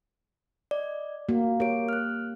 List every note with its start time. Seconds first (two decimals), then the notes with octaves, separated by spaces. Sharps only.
0.71 D5 D#5
1.29 A#3 F#4
1.60 G4 A#4 C#5 D7
1.89 F6 F#6